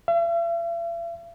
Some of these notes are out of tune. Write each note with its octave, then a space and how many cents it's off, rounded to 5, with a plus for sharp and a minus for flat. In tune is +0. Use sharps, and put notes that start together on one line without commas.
E5 +45